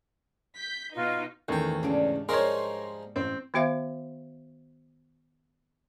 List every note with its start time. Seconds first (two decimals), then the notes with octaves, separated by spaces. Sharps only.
0.56 G6 B6
0.94 B2 D#4 F4 B4
1.48 A1 E2 D#3 G5
1.83 G#2 C#3 G3 D4
2.29 F3 D#4 G#4 A#4 C#5 C6
3.16 A1 C4
3.54 D#3 B3 F#4 C5 E5 F5